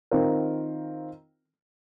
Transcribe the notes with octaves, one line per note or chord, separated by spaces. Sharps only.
D#3 C4 F4 A#4